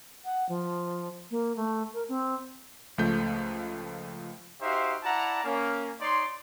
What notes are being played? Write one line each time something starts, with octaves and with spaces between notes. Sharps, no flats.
F#5
F3
A#3
A3
A#4
C4
C#2 F3 A3 G6
D#4 F#4 G4 C5 E5 F5
E4 D5 F#5 A5 A#5
A#3 C#4
D#4 C#5 D5 C6